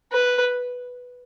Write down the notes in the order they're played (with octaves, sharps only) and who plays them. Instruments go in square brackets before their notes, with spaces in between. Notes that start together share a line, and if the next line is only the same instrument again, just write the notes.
[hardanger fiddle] B4